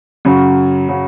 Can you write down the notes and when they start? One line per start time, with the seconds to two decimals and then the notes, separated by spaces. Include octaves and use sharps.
0.25 F#2 C#3 F#3
0.88 C#3 F#3